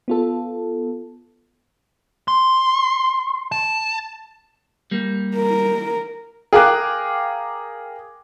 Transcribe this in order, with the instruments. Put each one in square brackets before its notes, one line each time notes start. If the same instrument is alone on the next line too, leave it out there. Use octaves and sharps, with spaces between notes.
[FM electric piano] B3 F4 A4
[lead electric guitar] C6
A5
[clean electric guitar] G3 A#3
[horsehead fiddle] A#4
[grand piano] G#4 A#4 F5 G5 D6 F#6